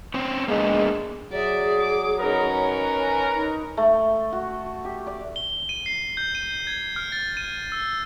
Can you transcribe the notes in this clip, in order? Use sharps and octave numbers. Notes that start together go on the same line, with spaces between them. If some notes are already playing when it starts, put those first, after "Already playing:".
C4 C#4 C5
G#3 A#3 B3 D4
F#3 G#4 D5 E5
D6
C#4 D#4 A#4 B4 C#5
G#5
D#4
A3
F#4
G4
D5
G7
D#7
C7
G6
D#7
G#6
F6
A6
D#7
E6